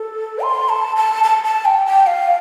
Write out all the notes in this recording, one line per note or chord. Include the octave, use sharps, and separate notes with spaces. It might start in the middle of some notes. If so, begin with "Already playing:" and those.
Already playing: A4
C6
A5
A5
A5
A5
G5
G5
F5